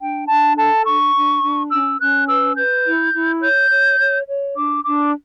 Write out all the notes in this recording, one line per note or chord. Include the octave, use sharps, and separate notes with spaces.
D4 G5
D4 A5
A4 A5
D4 C#6
D4
D4
C#4 E6
C#4 F#6
B4 E6
B4 G6
E4
E4
C#5 G6
C#5
C#5
C#5
D4 D6
D4 D6